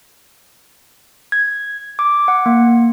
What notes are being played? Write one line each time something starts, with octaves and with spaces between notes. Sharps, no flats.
G#6
D6
F#5
A#3